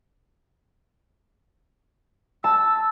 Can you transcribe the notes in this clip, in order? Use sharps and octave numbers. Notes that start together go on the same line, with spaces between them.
A5 E6